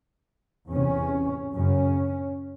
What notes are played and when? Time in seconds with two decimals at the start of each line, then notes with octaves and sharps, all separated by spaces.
0.72 E2 C3 C#4
1.55 F#2 C#3 C#4